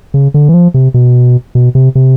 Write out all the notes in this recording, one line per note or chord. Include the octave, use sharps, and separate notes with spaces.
C#3
D3
E3
F3
C3
B2
B2
C3
C3